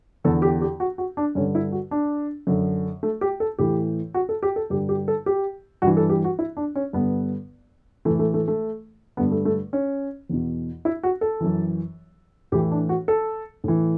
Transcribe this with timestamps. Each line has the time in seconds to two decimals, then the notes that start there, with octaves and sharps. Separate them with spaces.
0.24 E2 D3 A4
0.42 G4
0.61 G4
0.80 F#4
0.98 F#4
1.17 D4
1.35 G2 D3 C#4
1.55 E4
1.72 F#4
1.91 D4
2.47 F#2 D3
3.03 A3
3.21 G4
3.40 A4
3.59 A2 E3 G4
4.14 F#4
4.29 A4
4.43 G4
4.56 A4
4.70 G2 D3 G4
4.89 G4
5.08 A4
5.26 G4
5.82 G2 E3 F#4
5.97 A4
6.10 G4
6.24 F#4
6.39 E4
6.57 D4
6.75 C#4
6.93 G2 D3 B3
8.05 A2 E3 A3
8.19 A3
8.34 A3
8.48 A3
9.17 G2 D3 B3
9.31 A3
9.45 A3
9.73 C#4
10.29 E2 B2
10.85 E4
11.03 F#4
11.21 A4
11.40 F#2 E3
12.52 A2 E3 G4
12.71 D4
12.89 F#4
13.08 A4
13.64 A2 E3